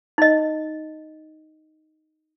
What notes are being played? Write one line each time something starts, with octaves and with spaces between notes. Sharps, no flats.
D#4 D#5